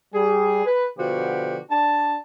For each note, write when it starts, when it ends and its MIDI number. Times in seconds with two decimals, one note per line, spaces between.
0.14 0.62 55
0.14 0.62 68
0.66 0.86 71
0.99 1.58 47
0.99 1.58 50
0.99 1.58 53
0.99 1.58 66
0.99 1.58 67
1.70 2.18 62
1.70 2.18 81